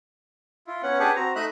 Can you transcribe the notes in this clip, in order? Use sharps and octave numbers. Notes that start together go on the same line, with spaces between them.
E4 F4
B3 C#4 F#5
D4 G4 G#4 B4 F#5
C4 F#4 A#5
A3 D#4 D#5 E5 B5 F#6